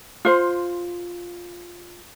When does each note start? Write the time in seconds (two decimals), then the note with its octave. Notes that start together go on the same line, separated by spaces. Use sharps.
0.25 F4 C5